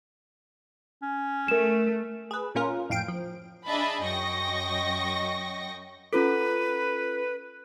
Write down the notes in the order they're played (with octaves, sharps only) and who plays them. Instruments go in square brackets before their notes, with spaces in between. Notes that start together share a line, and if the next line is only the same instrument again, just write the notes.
[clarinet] C#4
[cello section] A3 [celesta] A#4 E7
[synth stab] G#4 B4
A#2 A#3 C#4 F4 A#4
F2 A2 F5 G5 D7
F3
[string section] D4 G#4 D#5 E5 A5 B5
F#2 D#5 G5 C#6 A#6
[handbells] C#4 F4 A4 [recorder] B4